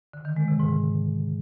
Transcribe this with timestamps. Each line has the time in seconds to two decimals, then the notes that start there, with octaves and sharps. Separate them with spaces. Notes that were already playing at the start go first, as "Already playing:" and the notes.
0.13 D3
0.25 D#3
0.36 G#3
0.48 C3
0.59 G#2